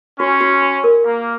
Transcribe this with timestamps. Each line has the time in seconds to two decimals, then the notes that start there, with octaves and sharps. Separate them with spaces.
0.20 C#4 F#4
0.41 F#4
0.62 F#4
0.84 A#4
1.04 A#3 F5